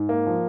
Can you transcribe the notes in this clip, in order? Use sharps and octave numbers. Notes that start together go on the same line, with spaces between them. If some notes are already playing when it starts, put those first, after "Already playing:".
Already playing: G#2
A#3
F3